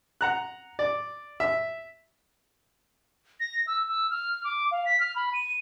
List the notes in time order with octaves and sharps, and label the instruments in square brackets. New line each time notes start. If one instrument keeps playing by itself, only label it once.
[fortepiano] F#5 A#5 F#6
D5
E5
[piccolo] A#6
E6
E6
F6
D6
F5
B6
F6
B5
D#7